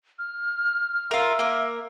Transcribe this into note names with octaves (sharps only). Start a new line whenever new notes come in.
F6
F4 A#4 E5
A#3 A#4